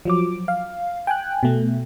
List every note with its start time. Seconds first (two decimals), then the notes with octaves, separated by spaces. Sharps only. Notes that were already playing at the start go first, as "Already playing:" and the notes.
0.05 F3 F#3 D6
0.48 F5
1.07 G5 G#5 F#6
1.43 B2 A3